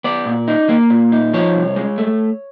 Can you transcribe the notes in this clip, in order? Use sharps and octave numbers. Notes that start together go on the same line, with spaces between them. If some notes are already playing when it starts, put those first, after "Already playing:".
B3 D5
A#2
D#4
A#3
A#2
D#4
F3 C#5
C2
G#3
A3